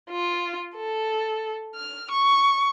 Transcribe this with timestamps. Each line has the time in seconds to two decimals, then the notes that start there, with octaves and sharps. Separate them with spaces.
0.11 F4
0.76 A4
1.75 F6
2.11 C#6